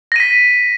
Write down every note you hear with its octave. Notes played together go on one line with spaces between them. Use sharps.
A#6 B6 D#7